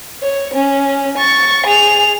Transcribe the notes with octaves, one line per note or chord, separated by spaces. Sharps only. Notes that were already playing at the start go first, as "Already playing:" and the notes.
C#5
C#4
C#6 A6
G#4 F7